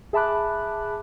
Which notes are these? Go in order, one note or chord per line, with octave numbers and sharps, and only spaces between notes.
G#4 E5 A5 B5 D6 F#6